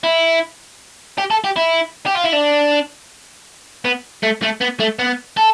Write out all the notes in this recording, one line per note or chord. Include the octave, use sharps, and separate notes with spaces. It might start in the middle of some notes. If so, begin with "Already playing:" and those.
E4
G4
A4
G4
E4
G4
F4
E4
D4
B3
A3
A3
B3
A3
B3
A4